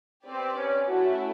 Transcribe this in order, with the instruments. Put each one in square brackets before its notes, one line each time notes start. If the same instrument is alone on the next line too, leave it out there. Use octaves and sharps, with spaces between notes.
[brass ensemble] C4 [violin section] G4 B4 D5
[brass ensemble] C#4
[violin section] A3 C#4 E4 [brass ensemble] F#4